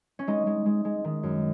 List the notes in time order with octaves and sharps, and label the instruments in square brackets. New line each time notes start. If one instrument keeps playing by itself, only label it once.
[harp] C#4
G#3 D#4
G#3
G#3
G#3
D#3
F#2